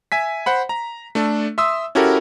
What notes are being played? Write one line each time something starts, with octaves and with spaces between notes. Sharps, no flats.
E5 G#5 B6
C5 F#5 B5
A#5
A3 D4 A4
E5 C6 D#6 E6
C#4 E4 F#4 G4 A4 A#4